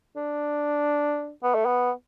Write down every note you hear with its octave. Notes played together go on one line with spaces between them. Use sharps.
D4
B3
A3
B3